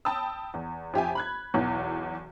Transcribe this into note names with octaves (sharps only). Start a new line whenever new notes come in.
G5 A5 B5 D#6 E6
E2
F2 G4 E5 G#5
B5 F#6 G#6
B1 E2 E3